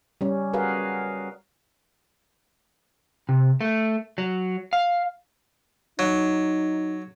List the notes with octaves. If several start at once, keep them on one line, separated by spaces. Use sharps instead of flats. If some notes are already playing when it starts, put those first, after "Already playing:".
G3 C#4
F#4 G#4 A#4 B4 F5
C3
A3
F#3
F5
F#3 D#4